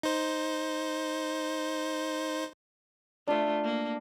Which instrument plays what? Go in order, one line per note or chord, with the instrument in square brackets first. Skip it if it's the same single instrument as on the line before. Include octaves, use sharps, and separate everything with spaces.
[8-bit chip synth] D#4 C5
[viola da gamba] A3 F4 [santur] D4 E5
[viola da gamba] A#3